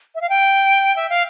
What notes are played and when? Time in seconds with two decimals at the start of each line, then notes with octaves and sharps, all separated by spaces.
0.15 E5
0.21 F5
0.29 G5
0.96 E5
1.09 F5